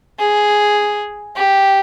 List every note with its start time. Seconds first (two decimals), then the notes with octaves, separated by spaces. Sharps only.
0.18 G#4
1.36 G4